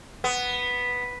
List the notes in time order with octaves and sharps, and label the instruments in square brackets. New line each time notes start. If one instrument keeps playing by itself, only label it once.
[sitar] B3